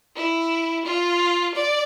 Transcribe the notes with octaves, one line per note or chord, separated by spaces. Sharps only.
E4
F4
D5